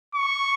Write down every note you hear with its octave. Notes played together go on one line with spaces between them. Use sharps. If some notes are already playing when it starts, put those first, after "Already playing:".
C#6